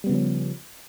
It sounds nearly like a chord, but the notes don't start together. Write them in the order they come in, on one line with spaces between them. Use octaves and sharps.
G3 B3 C#3 F3 C#4